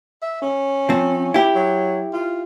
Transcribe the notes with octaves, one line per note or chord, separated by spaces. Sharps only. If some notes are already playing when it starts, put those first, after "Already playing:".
E5
C#4
F3 C4
E4 G4
F#3
F4